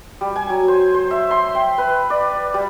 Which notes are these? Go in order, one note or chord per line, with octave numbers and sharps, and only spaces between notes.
G3
G#5
F#3
C5
C5
E5
C6
G5
B4
D5
G3